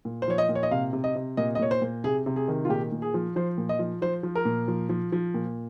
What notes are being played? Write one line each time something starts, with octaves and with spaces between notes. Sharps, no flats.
A#2
C5
F3 C#5
D#5
A#2
C#5
D#5
C3 F5
C3
D#5
C3
A#2 D#5
D#5
A#2 C#5
C5
A#2
C3 G#4
C3
G#4
D#3
F4
A#2 G4
A#2
G#4
F3
F3 C5
A#2
D#5
F3
F3 C5
F3
A#4
A#2
F3
F3
F3
A#2